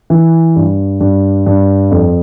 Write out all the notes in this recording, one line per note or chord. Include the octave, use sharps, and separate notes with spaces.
E3
G2
G2
G2
F2